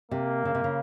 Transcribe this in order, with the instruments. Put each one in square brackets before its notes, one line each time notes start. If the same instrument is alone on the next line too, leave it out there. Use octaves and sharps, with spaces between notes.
[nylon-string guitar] C3 [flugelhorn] A#3
[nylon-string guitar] C#3
C3
C#3